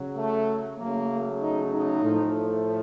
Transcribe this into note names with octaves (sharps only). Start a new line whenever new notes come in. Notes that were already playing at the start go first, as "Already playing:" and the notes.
Already playing: C#3 F#3
A3
C#3 F#3 A3 A#3
D#4
D#4
A2 F3 A3